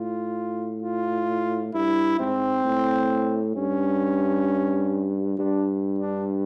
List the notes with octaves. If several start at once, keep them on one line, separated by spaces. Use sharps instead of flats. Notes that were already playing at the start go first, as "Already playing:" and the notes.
Already playing: A2 F4
F4
G2 E4
G#2 C4
A2
G2 C#4
G2 D4
D4